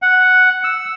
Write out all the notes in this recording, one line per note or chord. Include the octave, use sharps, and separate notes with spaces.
F#5
E6